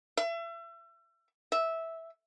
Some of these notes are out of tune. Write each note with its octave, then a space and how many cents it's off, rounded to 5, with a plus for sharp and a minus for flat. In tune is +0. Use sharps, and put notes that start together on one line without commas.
E5 +35
E5 -10